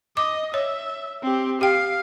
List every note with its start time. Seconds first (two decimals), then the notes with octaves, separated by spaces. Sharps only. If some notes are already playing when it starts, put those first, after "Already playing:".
0.17 D#5 D6
0.54 C#5 E5
1.22 C4 G4
1.61 G4 F5 G5